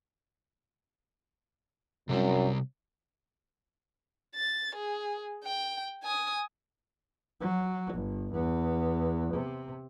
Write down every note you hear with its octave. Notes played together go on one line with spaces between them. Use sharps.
F#2 C3 G3 C4
A6
G#4
G5
G#5 D#6
F#3
G1
E2 B3
C3